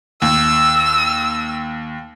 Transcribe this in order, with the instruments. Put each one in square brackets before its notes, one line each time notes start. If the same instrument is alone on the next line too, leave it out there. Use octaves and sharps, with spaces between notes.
[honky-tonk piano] D#2 [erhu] E6